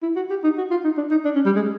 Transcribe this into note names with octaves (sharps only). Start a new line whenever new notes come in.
E4
F#4
G4
D#4
F#4
F4
D#4
D4
D#4
D4
C#4
G3
G#3